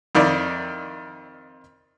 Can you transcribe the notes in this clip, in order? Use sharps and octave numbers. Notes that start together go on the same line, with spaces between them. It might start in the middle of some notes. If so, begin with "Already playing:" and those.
F2 D#3 E4 D5